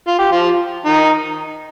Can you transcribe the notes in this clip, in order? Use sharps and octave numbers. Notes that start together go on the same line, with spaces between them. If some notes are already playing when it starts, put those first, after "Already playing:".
F4
G4
F3 F4
D#3 D#4